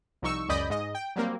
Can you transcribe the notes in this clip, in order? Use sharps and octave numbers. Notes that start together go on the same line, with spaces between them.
C2 F3 D#4 C#6 E6
C#2 F#2 D5 D#5 B5 G6
G#2 D#5
G5
F#3 G3 A#3 C4